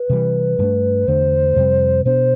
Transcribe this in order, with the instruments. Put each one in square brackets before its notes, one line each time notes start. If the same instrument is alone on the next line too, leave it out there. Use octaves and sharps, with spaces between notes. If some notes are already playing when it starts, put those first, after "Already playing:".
Already playing: [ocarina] B4
[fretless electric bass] C3 E3 G3
G2 D3 A3 D4
[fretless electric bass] E2 D3 A3 D4 [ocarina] C5
[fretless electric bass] F2 C3 G3 C4
[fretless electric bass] B2 B3 D4 [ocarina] C5